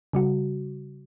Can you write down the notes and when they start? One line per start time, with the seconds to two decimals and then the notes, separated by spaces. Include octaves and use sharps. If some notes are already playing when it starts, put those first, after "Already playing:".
0.13 C#3 G3 F#4